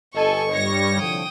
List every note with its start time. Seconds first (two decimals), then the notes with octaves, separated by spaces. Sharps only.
0.14 G1 A4 D#5 G#5 C#6
0.53 G2 G3 C#5 A#6 C#7
0.97 C2 D3 F3 G5 D#6